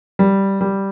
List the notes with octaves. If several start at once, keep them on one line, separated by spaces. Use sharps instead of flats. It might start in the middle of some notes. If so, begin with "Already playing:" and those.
G3
G3